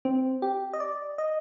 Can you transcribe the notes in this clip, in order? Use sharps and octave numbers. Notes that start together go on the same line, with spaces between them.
C4
G4
D#5
D5
D#5